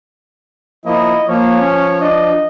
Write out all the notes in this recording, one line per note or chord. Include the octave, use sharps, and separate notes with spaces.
F3 A#3 E4 D#5
F3 A#3 C#5
C#4
D4 D#5